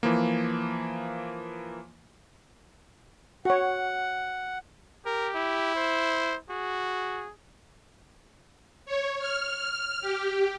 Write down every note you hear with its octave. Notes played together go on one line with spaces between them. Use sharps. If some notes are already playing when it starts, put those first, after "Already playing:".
E3 F3 A#3
F#4 C#5 F#5
G4 A#4
E4
C5
F#4 G#4
C#5
F6
G4